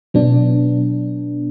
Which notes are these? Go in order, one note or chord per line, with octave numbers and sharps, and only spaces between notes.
B2 F#3 B3 D4